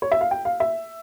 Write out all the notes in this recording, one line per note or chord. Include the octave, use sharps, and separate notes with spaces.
C#5
E5
F5
G5
F5
E5